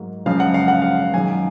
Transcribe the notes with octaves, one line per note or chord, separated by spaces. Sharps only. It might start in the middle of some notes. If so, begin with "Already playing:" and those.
Already playing: G#2 F#3 A#3
F#2 C#3 F3 G#3 F5
F#5
F5
F#5
F5
F#2 D#3 G#3 G#5